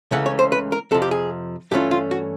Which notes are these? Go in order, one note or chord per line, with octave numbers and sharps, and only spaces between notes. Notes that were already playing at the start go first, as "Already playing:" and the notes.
C#2 C#3 E3 A3 C#4 F#5
C#5
C5
B4
A#4
F2 C3 F3 A4
G4
G#4
G2 E3 A3 C#4 F4 G4
F4
F#4